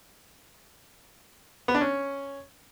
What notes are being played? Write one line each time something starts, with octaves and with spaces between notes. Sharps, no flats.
B3
D4
C#4